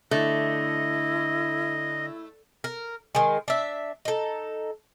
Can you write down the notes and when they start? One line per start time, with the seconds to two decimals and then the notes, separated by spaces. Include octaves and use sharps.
0.11 D3 A3 E4 D#5
2.64 A#4
3.15 D#3 G#3
3.48 D4 E5
4.05 D#4 A4